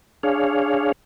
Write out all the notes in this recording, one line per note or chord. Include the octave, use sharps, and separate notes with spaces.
D4 G#4 C#5 F5